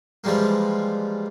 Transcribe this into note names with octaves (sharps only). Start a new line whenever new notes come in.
E3 F3 G3 G#3 A#3